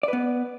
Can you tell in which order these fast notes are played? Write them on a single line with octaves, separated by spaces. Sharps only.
D5 B4 B3